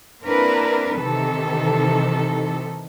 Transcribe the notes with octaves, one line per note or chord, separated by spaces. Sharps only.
A#3 C4 D4 E4 A#4 B4
C3 D#3 E3 D#4 A4